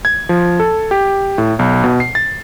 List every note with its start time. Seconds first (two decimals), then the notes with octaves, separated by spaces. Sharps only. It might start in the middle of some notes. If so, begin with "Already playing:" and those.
0.05 G#6
0.29 F3
0.60 A4
0.91 G4
1.38 A2
1.59 B1
1.84 B2
2.00 C7
2.15 A6